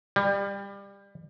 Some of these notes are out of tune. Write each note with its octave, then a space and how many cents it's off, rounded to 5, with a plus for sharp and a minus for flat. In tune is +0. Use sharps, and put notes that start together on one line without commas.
G3 +25